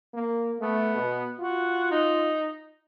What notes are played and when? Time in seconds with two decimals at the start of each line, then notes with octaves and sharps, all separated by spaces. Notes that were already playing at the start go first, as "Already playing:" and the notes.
0.14 A#3
0.60 A3 B3
0.96 B2
1.39 F4 F#4
1.91 D#4